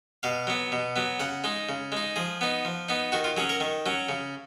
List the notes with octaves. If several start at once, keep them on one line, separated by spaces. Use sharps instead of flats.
B2 F5
F#3 B3
B2
F#3 B3
C#3 F#5
G#3 D#4
C#3
G#3 D#4
F3 G#4
B3 D#4
F3
B3 D#4
D#3 F#4
F4
F#3 C#4 G#4
A#4
D#3
F#3 C#4
C#3